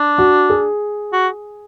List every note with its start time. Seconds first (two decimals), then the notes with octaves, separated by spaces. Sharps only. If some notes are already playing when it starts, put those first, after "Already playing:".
Already playing: D4
0.18 F#4
0.50 G#4
1.13 F#4